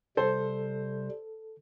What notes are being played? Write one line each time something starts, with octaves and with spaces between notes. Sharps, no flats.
C3 G3 A4 C5